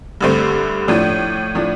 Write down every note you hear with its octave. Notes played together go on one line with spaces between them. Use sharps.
G2 D3 A3 C4
A2 F3 D4
A2 F3 D4